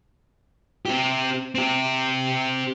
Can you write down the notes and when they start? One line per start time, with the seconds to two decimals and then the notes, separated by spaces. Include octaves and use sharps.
0.86 C4 G4
1.55 C4 G4